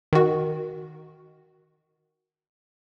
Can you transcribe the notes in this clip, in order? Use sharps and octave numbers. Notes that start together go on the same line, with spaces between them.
D#3 F#4